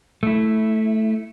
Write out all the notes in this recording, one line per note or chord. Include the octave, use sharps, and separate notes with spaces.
A3 E4